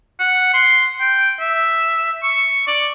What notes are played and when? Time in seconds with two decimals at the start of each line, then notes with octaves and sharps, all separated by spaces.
0.20 F#5
0.54 C6
1.01 G5
1.40 E5
2.23 C#6
2.67 D5